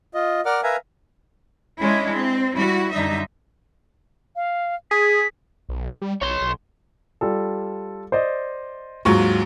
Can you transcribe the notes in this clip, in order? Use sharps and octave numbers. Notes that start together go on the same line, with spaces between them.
F4 D#5
A#4 D5 F#5 D6 F6
A#4 B4 E5 F5 G#5 A#5
G#3 C#4 D4 E4
C4
G3 E4 F#4
F#2 D3 G3 D#4 E5
F5
G#4 B6
B1
G3
B1 C#5 C6
B1
G3 F4 A4
C5 D5 D#5
D#2 G#2 F#3 F4 C#6